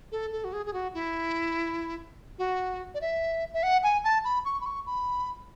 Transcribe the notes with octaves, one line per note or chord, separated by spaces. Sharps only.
A4
A4
F#4
G#4
G#4
F#4
E4
F#4
D5
E5
E5
F#5
G#5
A5
B5
C#6
B5
C#6
B5